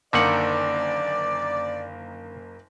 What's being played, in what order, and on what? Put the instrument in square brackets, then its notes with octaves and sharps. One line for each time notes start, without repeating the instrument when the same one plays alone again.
[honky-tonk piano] F#1 A#3 [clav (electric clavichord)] D3 D#3 F#5 [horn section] D5